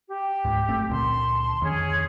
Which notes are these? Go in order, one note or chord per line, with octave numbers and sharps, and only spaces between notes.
G4
C#2 G#2
F#1 A3 C4
C#2 A#2 D3 A5 C6
F2 D#3 C#4 G#4